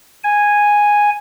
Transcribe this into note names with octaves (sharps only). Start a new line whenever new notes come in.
G#5